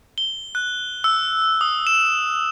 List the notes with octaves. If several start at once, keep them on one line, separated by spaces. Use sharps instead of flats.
G7
F#6
E6
D#6
E7